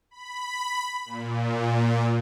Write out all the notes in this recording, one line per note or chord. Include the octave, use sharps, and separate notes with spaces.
B5
A#2